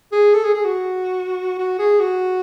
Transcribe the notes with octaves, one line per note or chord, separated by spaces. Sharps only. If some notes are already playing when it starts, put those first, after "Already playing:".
G#4
A4
G#4
G#4
F#4
F#4
G#4
F#4